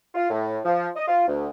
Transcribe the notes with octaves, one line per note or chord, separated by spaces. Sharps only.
F4
A2
F3
D#5
F4
D2